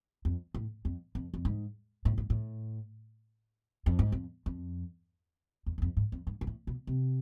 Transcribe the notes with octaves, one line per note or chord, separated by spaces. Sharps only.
F2
A2
F2
F2
F2
G#2
A2
G#2
A2
F2
G#2
F2
F2
E2
G#2
F2
G#2
F2
G#2
G#2
A2
B2
C3